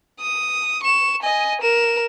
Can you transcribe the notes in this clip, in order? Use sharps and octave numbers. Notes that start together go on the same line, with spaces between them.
D#6
C#6 E7
D#5 G#5
A#4 E7